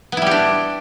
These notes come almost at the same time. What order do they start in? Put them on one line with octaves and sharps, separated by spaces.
B3 E4 G3 G4 D4